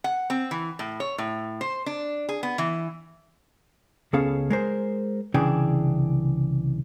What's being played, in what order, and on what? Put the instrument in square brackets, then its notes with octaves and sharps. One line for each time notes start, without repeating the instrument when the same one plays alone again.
[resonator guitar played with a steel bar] F#5
C4
E3
A2
C#5
A2
C5
D4
G#4
B3
E3
[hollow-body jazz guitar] C#2 B3 C#4 G#4 A4 F5
G#3 A#4 C5
C2 C#3 E3 D4 G#4 G5